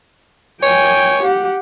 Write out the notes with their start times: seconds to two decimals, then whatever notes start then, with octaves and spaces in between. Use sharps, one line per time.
0.63 C#5 G5 G#5
1.23 G4 F#5